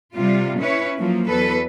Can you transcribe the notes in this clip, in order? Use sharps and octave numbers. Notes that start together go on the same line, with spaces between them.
C3 G3 F4
C#4 E4 B4 C#5
F3 F#3 A#3
E2 F#3 A4 B4